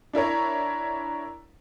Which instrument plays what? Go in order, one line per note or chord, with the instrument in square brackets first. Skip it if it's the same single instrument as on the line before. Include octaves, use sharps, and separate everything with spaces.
[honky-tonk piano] D4 E4 A#4 C#5